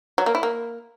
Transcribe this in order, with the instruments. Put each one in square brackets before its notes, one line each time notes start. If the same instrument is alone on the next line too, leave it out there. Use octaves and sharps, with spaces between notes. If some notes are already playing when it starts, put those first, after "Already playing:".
[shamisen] F#3
A#3
E4
A#3